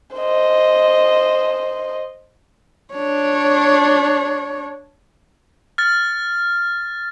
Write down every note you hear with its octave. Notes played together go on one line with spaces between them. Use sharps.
C5 D#5
D4 C#5
F6 A6